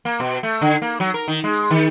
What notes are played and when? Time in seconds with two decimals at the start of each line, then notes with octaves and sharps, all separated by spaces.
0.05 A#3
0.20 B2
0.43 A3
0.61 D3
0.82 A#3
1.00 F#3
1.14 A#4
1.28 D#3
1.44 G#3
1.71 D#3